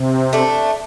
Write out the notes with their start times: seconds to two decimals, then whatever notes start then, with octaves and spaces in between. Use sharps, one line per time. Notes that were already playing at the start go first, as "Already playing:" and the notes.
Already playing: C3
0.33 A3 D4